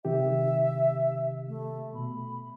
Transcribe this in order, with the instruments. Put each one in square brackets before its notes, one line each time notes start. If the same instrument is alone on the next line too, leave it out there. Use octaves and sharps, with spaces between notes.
[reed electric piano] C3 D#3 G4 [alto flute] E5
[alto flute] A3
[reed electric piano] B2 [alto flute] B5